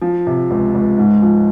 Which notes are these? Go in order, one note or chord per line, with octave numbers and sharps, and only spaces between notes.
F3
C3
C#2
C#2
G#2
F3